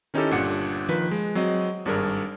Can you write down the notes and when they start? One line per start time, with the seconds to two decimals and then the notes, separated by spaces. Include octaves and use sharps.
0.14 D#3 C#4 D#4 E4 G4 A4
0.31 G1 A#2 D4 G4 F#5 C#7
0.89 D#3 F3 B4
1.11 G#3
1.35 F#3 C4 G#4 D#5
1.86 G#1 G2 D4 G#4 A#4